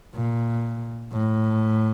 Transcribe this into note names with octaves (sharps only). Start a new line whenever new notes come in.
A#2
A2